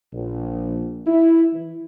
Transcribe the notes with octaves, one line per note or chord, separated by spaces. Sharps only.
A#1
E4
E3